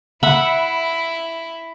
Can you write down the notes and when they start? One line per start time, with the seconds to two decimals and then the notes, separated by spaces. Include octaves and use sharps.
0.23 E4 E5 F#5 B5